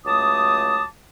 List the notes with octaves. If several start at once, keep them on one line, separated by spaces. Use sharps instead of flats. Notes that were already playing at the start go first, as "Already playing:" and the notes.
C#2 F#3 A3 A5 D6 D#6